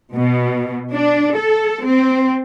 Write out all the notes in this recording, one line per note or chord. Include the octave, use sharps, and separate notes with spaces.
B2
D4
A4
C4